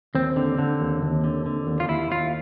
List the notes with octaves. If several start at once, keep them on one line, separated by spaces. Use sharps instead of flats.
D#2 C4
D3
D3
D#2
D#2
D3
D3
D#2
F4
D#2 E4
D#2 F4